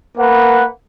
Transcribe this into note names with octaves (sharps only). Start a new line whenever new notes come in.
A#3 B4 F#5